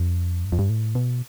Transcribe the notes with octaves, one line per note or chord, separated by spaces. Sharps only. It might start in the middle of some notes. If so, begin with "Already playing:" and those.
Already playing: F2
G2
F2
G2
A2
B2